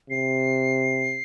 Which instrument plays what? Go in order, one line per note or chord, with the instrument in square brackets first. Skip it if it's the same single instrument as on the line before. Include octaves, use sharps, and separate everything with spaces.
[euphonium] C3 [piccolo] C7